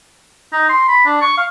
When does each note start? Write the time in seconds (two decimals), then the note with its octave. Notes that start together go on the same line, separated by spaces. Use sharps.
0.52 D#4
0.69 C6
0.88 B5
1.06 D4
1.21 C#6
1.37 F5